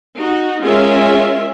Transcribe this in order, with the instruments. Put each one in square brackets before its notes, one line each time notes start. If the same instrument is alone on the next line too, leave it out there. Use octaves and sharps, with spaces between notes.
[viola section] D#4 F#4
G#3 C#4 F4 G#4 A#4 E5